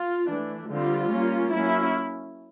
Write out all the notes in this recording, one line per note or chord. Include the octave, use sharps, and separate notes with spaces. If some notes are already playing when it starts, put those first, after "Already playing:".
Already playing: F4
E3 A3 D4
D3 G3 C4 F4
G3 A#3 C#4
F#3 A#3 C#4 E4